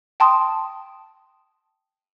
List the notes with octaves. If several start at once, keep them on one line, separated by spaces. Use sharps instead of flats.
G5 A5 C6 D#6